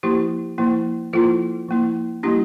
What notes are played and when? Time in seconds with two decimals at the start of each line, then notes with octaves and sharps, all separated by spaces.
0.03 F3 A#3 E4 G4
0.58 F3 A#3 E4
1.13 F3 A#3 E4 F4 A4
1.69 F3 A#3 E4
2.23 G3 A#3 D4 E4 G4